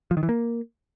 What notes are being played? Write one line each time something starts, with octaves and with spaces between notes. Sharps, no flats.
F3
D#3
E3
A#3